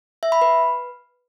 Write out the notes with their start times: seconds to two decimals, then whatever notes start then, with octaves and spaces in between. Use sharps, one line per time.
0.23 E5
0.32 B5
0.41 B4